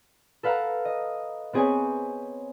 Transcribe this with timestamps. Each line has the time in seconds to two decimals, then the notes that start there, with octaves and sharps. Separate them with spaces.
0.43 A4 B4 F5 F#5 A#5
0.85 D#5
1.53 B3 C4 G#4 B4 C#5 G#5